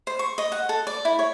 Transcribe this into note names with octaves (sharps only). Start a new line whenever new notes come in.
C5
C#6
D#5
F#5
A4
D5
E4
C#5